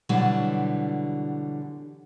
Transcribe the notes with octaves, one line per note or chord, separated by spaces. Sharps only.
B2 D3 E3 F#3 G3